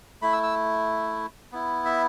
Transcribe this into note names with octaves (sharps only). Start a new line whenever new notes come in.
A3 E4 B5
E6
E6
B3 E4
E5